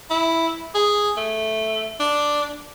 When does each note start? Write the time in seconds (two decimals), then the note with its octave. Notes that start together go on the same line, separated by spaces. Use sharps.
0.10 E4
0.75 G#4
1.17 A3
2.00 D4